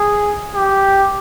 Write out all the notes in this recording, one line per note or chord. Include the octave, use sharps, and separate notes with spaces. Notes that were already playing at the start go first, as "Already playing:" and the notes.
Already playing: G#4
G4